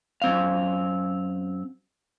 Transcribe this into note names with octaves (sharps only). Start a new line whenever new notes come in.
F#2 C4 F5